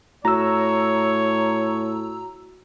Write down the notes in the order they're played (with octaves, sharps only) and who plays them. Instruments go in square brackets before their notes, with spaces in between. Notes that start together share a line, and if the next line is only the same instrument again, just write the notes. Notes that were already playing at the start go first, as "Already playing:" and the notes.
[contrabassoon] A2 [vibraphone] F#4 [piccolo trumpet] C#5 [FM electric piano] A#5 E6